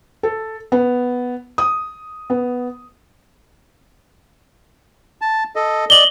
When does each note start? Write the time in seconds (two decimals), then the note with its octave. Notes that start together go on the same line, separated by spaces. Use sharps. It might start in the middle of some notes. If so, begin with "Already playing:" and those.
0.23 A4
0.72 B3
1.58 D#6
2.30 B3
5.21 A5
5.56 A4 D#5
5.90 D5 D#5 F#7 G7